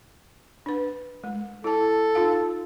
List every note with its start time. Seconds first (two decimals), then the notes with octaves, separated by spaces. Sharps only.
0.66 D4 B4
1.24 G#3
1.64 E4 A4 A5
2.15 D#4 F4 F5